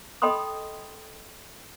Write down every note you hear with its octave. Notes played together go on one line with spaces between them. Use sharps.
A4 D#5 G5 B5 C6 D#6